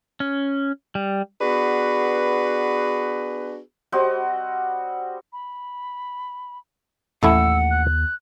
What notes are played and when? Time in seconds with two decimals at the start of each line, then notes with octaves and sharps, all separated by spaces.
0.20 C#4
0.95 G3
1.41 B3 D4 F#4 G#4 B4
3.92 G3 C4 F#4 D#5
5.33 B5
7.23 A1 D#2 A3 E4 F#5 E6
7.71 F#6